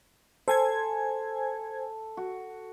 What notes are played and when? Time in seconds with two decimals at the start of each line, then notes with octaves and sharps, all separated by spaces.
0.48 A4 C5 G#5 G#6
2.17 F#4